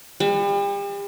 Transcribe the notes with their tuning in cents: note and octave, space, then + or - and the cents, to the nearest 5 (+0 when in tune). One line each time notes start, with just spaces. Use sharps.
G3 +40